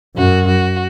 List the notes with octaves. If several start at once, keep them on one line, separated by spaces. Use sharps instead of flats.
F#2 F#4
F#4